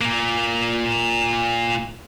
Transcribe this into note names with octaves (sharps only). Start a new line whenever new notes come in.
A#2 A#3